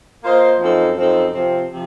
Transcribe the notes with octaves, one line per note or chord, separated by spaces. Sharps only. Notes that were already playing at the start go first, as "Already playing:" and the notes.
A#3 F4 C5 D#5
F#2 F3 C4 D#4 A4
F#2 F3 C4 D#4 A4
C3 F3 C4
C3 F3